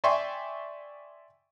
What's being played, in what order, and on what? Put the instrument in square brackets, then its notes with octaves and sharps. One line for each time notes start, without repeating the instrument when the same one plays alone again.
[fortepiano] D5 E5 G5 G#5 C6 C#6